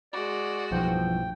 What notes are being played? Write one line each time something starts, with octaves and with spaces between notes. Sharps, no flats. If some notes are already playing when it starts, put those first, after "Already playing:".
G#3 F#4 D5
B1 G2 E3 F3 G5